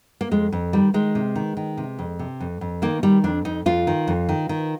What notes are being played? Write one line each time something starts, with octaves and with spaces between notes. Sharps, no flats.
A#3
F2 G#3
F2
D#3 G3
D#3 G#3
C3
D#3
D#3
C3
F2
C3
F2
F2
D#3 A#3
D#3 G3
F2 D4
F2 D#4
F2 F4
D#3
F2
D#3
D#3